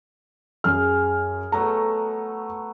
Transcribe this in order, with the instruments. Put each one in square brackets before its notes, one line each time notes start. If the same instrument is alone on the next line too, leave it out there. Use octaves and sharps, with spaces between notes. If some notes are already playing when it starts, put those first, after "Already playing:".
[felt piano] F#2 F6 [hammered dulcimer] G#4
[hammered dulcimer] F#3 A3 B3 [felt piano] A#5